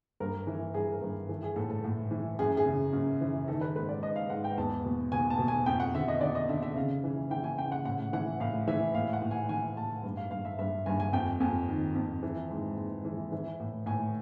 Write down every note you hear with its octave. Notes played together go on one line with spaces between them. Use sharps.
G2 A#4
E3
G2 G#4
A#4
G2
E3 A4
G#4
A2 A4
A4
A2
E3
F#2 G#4
G#4
C#3
F#2
E3
D#3 A4
B4
G#2 B4
D5
G#2 D#5
F5
G#2 F#5
G5
E2 A5
B2
B2 G#5
A5
B2
G#5
F2 G5
F#5
D3 E5
D#5
D3 D5
D#5
D3 E5
E5
C#3 F5
E3
E3 G5
G#5
C#3 G5
F#5
A2 F#5
E3 F#5
A2 F5
E3 E5
A2 F5
F#5
A2
G#5
E3 G#5
A2 A5
G2
F5
G2 F5
E5
G2 E5
G2 G#5
G#5
F2 G5
F2 G#5
D#3
F2
E3
G#2
G#2
E3
E3
A2
A2 G#5